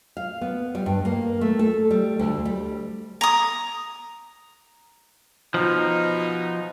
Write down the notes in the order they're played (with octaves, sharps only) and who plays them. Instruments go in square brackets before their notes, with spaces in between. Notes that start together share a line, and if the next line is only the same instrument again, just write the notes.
[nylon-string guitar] F5
B3
G3
G2
A#3
A3
A4
G3
D2
G3
[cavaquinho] A#5 D#6
[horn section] B2 D#4 [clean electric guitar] F3